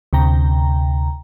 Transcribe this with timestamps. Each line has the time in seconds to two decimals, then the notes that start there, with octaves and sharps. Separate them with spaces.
0.13 D2 C3 G5 A#5